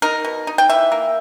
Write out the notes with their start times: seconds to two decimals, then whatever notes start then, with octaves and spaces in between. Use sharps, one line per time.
0.02 D#4 A#4
0.25 B2
0.47 D#4
0.58 G5
0.69 E3 E5
0.92 A#3